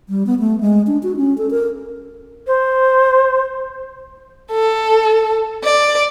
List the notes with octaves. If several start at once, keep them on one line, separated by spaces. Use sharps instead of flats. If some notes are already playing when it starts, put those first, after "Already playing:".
G3
B3
A3
G#3
D4
F#4
C#4
A4
A#4
C5
A4
D5